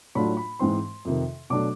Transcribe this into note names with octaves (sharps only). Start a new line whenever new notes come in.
A2 F#3 A3 D4 F4 B5
B5
G#2 E3 G#3 C4 C6
F2 C3 D#3
B2 F#3 A3 D4 D6